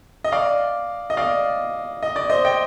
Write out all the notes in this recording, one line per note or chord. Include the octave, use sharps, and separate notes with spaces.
D#5
D5 F5
D#5
D5 F5
D#5
D5
C5 D#5
D#5 G5